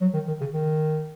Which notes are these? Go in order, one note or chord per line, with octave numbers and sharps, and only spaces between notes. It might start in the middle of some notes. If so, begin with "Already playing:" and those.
F#3
D#3
D#3
C#3
D#3